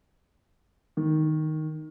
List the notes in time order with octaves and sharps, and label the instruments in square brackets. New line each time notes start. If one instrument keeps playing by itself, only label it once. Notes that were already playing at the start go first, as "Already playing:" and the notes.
[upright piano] D#3